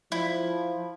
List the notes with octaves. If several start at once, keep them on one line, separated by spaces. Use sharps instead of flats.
F3 E4